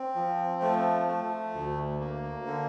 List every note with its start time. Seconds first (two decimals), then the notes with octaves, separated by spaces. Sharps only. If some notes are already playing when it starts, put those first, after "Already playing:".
Already playing: C4
0.15 F3
0.62 A3
1.08 A3
1.54 D2
2.01 A#3
2.47 D3